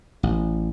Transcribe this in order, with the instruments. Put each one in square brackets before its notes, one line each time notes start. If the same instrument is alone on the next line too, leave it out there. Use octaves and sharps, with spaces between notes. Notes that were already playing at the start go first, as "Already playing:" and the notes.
[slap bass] A1